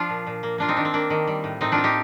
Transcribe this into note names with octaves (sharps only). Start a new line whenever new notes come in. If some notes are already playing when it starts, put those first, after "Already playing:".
Already playing: F3 D4 F4
A#2
A#2
A#3
A#3 D4 F4
C4 D#4
D#3 D4
C4
A#3 D4
D#3
G3
A2
A2 C4 D#4
D4 F4
C4
D#4 G4